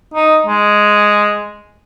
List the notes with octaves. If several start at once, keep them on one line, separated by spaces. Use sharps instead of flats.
D#4
G#3